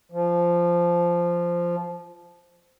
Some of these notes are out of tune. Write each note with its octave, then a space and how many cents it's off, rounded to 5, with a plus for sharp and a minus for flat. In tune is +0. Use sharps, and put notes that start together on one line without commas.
F3 -10